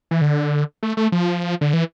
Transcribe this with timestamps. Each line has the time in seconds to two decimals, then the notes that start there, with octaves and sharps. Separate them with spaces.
0.11 E3
0.21 D3
0.83 A3
0.97 A3
1.12 F3
1.61 D3
1.73 E3